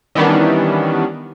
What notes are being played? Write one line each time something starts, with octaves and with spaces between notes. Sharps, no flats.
D#3 E3 G3 B3 C#4 D4